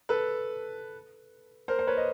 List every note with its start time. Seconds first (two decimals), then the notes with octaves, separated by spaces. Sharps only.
0.09 A4 B4
1.68 A#4 C5
1.79 C5
1.87 B4 C#5
1.97 D#5